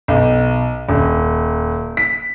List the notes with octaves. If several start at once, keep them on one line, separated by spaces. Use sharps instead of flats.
B1
D#1
B6